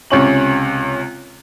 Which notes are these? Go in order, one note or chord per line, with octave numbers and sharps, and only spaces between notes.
C#2 C3 C#4 C#6 F#7